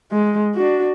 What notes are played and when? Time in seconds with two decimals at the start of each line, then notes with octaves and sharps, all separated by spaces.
0.12 G#3
0.55 D4 F#4